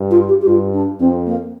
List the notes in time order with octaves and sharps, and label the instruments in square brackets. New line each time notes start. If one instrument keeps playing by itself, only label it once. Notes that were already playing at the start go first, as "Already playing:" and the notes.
Already playing: [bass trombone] G2
[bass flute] F4
G4
G4
[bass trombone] G2 [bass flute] F4
[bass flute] D4
[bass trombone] F2 [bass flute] C4
[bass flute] A#3